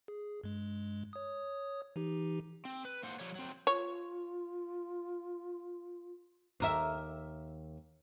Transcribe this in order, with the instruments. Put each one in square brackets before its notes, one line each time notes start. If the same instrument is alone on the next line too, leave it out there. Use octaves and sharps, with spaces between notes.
[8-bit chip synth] G#4
G2 G#3
C#5 D#6
E3 D#4 G4
[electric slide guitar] C4
B4
A#3 C5 F#5
F3 G3 C#5
F#3 C4
[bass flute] F4 [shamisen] C#5
[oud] D#2 A#4 E5